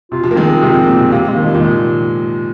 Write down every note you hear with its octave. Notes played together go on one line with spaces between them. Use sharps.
C3 F4
C3 F3
A#3
D#3 G#3 C4
C3 F3
C3
A#2
C3
C3 A#3
G#3
D#3
F3 G#3
A#2 D#3
G#3